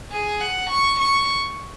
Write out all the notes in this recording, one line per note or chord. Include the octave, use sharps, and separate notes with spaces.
G#4
F#5
C#6
C#6